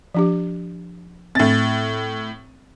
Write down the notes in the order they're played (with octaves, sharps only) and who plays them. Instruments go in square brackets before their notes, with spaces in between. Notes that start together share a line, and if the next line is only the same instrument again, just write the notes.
[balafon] F3 D4 G4
[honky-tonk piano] A2 A6 [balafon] C4